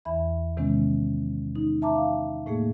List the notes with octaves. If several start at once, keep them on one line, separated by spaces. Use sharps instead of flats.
E2 E3 E5 B5
C3 D#3 G#3 B3 C#4
D#4
E5 A5 A#5 D6
F5
A2 A3 A#3 G#4